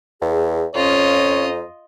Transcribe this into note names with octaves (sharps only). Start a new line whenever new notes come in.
E2 G#4
F2 C#4 F4 C#5 D#5